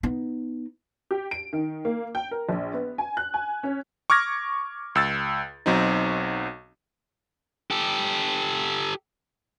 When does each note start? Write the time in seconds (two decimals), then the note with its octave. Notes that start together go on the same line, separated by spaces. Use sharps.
0.03 B3 D#4
1.11 G4
1.31 D7
1.53 D#3
1.85 A#3
2.15 G5
2.31 A#4
2.49 A#1
2.73 B3
2.98 G#5
3.17 F#6
3.34 G#5
3.63 C#4
4.10 C#6 D6 F6 G#6 A#6
4.95 C#2 E6 A6
5.66 B1 F#3 C4 D#4
7.71 G4 A4